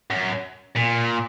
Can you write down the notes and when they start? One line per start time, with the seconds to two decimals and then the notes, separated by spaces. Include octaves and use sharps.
0.11 F#2
0.76 A#2